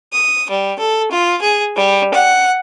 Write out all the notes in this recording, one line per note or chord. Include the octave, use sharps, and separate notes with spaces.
D#6
G3
A4
F4
G#4
G3
F#5